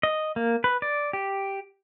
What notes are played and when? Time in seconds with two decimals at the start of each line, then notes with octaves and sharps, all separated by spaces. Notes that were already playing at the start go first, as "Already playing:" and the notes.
0.03 D#5
0.36 A#3
0.64 B4
0.82 D5
1.13 G4